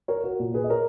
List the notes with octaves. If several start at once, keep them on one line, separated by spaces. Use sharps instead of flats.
A#4 C#5
F#4 A#4
A#2
G#4 B4
D#5
A#4 C#5